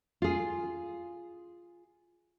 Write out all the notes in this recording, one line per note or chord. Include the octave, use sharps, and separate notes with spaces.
F4 G#4